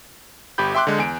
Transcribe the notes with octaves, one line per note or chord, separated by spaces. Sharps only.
G1 G4 B5 G6
E5 G5 C6 D6 F#6
D3 G#3
E2 G#5 D7